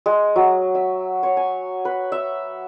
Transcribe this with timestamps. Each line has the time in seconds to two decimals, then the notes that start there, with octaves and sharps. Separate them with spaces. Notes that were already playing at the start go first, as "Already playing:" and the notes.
0.06 G#3
0.36 F#3
0.75 E5
1.23 C#5
1.37 G#5
1.85 B4
2.12 E5